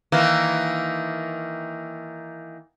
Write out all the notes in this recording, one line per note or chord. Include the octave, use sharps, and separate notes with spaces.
D#3 E3 A#3